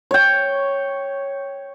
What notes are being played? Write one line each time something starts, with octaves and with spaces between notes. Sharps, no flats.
C#5 G5